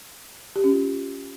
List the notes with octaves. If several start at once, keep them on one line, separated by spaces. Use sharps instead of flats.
G4
C#4
F4